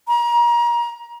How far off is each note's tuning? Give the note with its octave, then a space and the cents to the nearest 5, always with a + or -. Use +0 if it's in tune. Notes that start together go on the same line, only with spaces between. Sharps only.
A#5 +30